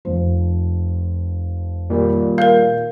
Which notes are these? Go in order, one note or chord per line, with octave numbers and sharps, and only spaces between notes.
F1 F3
A#2 D#3 G3
A#4 F5 G6